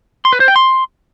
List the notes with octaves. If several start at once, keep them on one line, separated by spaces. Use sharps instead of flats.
C6
B4
C5
G5
C6